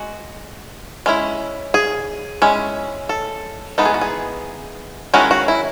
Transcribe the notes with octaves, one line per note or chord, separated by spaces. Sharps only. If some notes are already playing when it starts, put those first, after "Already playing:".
Already playing: G#3 F#4
G#3 C#4 E4
G#4
G#3 C#4 E4
A4
E3 G#3 B3 D#4 A4
G#4
F#4
G#4
D#3 G#3 C#4 E4 F#4
F#4
E4